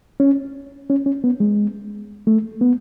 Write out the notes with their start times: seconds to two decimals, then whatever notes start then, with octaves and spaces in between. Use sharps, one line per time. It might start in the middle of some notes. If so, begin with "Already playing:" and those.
0.20 C#4
0.90 C#4
1.06 C#4
1.24 B3
1.40 G#3
2.27 A3
2.61 B3